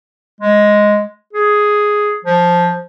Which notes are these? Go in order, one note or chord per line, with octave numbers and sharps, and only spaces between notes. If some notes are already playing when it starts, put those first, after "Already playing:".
G#3
G#4
F3